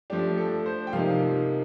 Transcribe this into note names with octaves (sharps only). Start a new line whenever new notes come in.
F3 A3 D4 G4
A4
C5
G5
C3 F3 A#3 D#4 F5